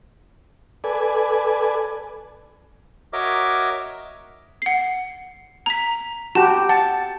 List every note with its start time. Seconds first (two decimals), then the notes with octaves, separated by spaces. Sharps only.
0.84 A4 B4 D5 G#5
3.13 F#4 A#4 C#5 D#5 E5 D6
4.62 F#5 C7
5.66 A#5 B6
6.35 F#4 G4 A5
6.69 F#5 A5